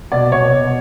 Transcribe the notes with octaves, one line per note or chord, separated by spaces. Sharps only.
B2 D5
B2 C#5
B2